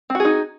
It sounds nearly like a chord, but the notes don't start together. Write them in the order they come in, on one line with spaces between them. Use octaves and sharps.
C4 F#4 G#4 D#4